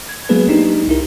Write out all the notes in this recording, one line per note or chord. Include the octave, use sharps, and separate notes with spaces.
G#6
F#3 G#3 A#3 B3 G#4 B4
D4 D#4 G4
C2 E4 A#4